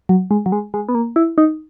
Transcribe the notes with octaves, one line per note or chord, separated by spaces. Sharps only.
F#3
G#3
F#3
G#3
G#3
B3
A#3
E4
D#4